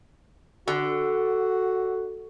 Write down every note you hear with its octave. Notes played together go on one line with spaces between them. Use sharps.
D3 F#4